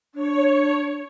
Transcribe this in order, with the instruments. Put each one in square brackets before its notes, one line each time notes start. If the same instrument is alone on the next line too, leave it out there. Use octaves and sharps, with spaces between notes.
[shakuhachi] D4 [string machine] C#5